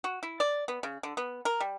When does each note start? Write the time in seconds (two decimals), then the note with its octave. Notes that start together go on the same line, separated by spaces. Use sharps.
0.04 F#4
0.23 E4
0.40 D5
0.68 B3
0.83 C#3
1.03 D3
1.17 B3
1.45 A#4
1.60 G3